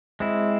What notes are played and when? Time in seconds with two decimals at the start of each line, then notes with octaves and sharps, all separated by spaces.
0.20 G#3 C4 E4